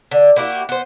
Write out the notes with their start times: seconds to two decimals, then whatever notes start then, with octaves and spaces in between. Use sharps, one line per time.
0.11 D3
0.36 A#3 E4 F#4 G4
0.69 B3 C5